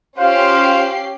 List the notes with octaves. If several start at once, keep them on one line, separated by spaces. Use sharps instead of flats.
C#4 F4 G4 C5 F5 C7